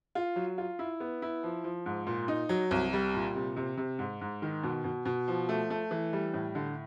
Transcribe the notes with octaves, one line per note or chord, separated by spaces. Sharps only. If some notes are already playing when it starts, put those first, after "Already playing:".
F4
F#3
F4
E4
B3
E4
F3
F3
G#2
A#2
D#4
F#3
C2
G3
A#2
C3
C3
C3
G#2
G#2
D#3
B2
B2
B2
F3
A3
A3
E3
G3
A2
D3